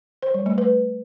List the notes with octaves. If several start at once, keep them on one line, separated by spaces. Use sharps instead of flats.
C5
G3
A3
B4